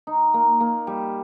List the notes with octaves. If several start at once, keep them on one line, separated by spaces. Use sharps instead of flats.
D#4
A#3
A#3
G3